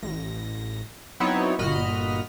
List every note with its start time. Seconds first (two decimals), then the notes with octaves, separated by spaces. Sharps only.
0.03 A1 A#6
1.20 F#3 B3 C4 D#4 E4 C#5
1.59 G1 A#2 F#4 D#5 B5 F6